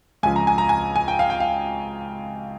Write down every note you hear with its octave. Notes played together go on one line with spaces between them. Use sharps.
C#2 C#3 F3 G#5
A#5
G#5
A#5
G#5
G#5
G5
F5
G5
F5